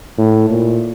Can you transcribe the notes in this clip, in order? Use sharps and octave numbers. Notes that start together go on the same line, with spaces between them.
A2
A#2